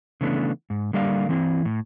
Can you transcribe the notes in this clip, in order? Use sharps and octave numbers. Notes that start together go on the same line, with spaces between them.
C#3 E3 A3 B3 D4
G#2
D3 G3 A#3 D5 F5
E3 C4 E4
A2